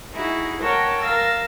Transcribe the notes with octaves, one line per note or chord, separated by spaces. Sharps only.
D#4 E4 F#4 G#4
A#4 C#5 F#5 G5 A5
A#4 F5 E6 A6